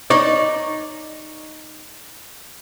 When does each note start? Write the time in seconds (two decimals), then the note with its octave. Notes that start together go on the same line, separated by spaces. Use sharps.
0.10 D#4 C#5 D5